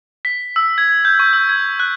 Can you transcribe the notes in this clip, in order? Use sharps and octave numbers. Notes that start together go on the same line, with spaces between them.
B6
E6
G#6
G6
C#6
E6
G#6
F#6